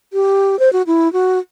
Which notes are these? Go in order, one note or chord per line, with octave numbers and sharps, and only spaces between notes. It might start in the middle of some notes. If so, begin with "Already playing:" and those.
G4
C5
F#4
E4
F#4